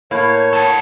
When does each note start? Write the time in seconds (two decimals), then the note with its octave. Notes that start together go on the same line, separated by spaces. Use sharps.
0.11 A2 A#3 C#5
0.53 B3 A4